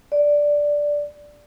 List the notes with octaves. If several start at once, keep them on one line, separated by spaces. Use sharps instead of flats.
D5